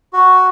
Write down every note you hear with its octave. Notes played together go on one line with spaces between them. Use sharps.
F#4